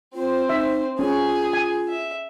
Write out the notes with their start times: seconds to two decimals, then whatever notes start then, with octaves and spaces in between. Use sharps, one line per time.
0.15 C4 F4 C5
0.49 D#4 E5
0.99 C#4 F4 G#4
1.53 G#5
1.88 E5